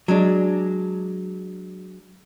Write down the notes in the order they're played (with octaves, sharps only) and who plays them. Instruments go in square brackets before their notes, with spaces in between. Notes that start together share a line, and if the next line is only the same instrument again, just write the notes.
[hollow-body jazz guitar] F#3 G#3 D4